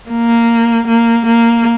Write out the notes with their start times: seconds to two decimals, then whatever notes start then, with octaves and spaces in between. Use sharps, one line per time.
0.11 A#3
0.87 A#3
1.26 A#3